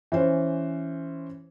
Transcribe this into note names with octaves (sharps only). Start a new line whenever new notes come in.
E3 C#4 C5